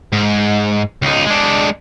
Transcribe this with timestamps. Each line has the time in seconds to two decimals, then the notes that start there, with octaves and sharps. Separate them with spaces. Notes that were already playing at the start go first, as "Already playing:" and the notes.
0.13 G#2
1.02 C#2 D#4
1.26 G#3 D4